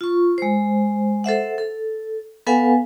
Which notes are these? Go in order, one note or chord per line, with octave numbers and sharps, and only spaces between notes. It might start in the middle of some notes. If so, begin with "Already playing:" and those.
F4 C#6
G#3 C5
A4 C5 E5 F#5
A4
B3 A4 B4 F5 F#5 G#5